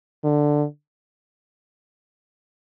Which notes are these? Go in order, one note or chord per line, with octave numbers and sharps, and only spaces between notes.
D3